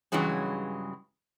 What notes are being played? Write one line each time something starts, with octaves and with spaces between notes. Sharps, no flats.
G2 C#3 E3 F#3 G#3 C#4